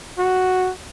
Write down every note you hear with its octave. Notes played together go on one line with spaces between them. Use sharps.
F#4